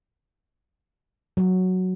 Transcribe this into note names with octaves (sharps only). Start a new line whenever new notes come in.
F#3